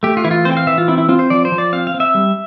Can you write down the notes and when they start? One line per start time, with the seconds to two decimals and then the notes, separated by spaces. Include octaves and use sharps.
0.03 A3 G4
0.17 F4
0.24 E3 E4
0.31 F4
0.45 C4 C5
0.52 G5
0.57 F5
0.67 E3 E5
0.78 F4
0.88 C4 E4
0.98 E4
1.09 C4 F4
1.19 C5
1.30 F3 D5
1.45 C5
1.52 F3
1.58 D5
1.73 C4 F5
1.87 F5
1.94 C4
2.00 E5
2.15 G3